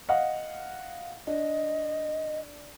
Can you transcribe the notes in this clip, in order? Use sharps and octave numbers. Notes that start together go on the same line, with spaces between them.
D#5 F5 F#5
D4 D#5